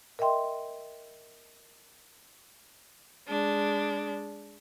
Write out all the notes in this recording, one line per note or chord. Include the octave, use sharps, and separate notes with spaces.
A#4 D#5 E5 G5 C6
G#3 D4